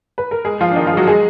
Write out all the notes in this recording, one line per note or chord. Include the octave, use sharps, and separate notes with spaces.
B4
A#4
G#3 G#4
F3 F4
D4
D#3 D#4
F3 F4
G#4
F#3 F#4
G#3 G#4